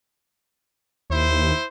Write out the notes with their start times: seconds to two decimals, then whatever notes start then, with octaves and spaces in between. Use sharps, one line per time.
1.10 D#2 E4 C5